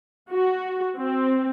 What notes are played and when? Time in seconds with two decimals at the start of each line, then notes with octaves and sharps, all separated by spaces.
0.31 F#4
0.97 C4